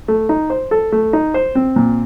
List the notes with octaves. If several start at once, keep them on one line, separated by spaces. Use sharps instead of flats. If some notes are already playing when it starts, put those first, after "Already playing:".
A3
D#4
C5
A4
A3
D#4
C5
C4
A#2